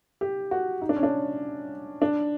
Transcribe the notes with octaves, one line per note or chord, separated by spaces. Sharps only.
G4
F#4
D#4
D4
C#4
D4
D4